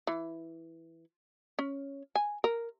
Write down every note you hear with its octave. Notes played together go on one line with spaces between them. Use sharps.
E3
C#4
G#5
A#4